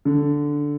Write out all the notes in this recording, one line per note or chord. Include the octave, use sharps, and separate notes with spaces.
D3